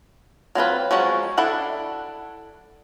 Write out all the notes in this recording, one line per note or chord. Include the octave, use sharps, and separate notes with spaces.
F#3 C4 F4 B4
F3 F#3 G#3 C#4 F#4
D4 E4 A4 F#5